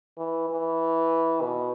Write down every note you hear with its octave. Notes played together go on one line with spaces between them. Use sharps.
E3
E3
B2